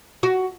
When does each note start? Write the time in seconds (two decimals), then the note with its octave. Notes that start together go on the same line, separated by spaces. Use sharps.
0.23 F#4